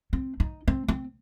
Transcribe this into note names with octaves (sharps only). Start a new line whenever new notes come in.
C4
D#4
C4
C4